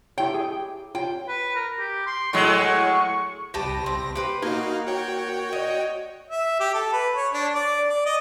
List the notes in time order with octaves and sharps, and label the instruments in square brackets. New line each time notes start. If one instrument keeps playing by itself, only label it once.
[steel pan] E4 C#5 [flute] G4 [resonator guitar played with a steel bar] G5
[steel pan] G#4
[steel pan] F4 [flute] C#5 [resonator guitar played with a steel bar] G5
[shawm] B4
A#4
G4
C6
[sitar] A2 F#3 G#3 [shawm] C#6
[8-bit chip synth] C2 A#6 [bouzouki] G4 B4 A5
[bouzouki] C4 G4
G4 B4 C5
[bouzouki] A#3 [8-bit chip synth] D#4 F#4 F5
[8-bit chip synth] F#4 C#5 G5
[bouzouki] D#5
[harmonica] E5
G4
A4
B4
C#5
D4
D5
D5
D#5